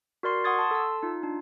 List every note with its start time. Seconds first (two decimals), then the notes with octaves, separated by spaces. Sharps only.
0.23 F#4 A#4 D5 C6 C7
0.44 F#5 C6 C#6 D#6 G#6 A6
0.59 A5 C6
0.71 A4 A5 E6
1.03 D#4 F4
1.23 D4